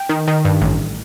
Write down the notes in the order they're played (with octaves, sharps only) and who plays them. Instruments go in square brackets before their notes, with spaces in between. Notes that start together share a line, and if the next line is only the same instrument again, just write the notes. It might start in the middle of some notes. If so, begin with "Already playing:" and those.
Already playing: [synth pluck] G5
D#3
D#3
G2
A1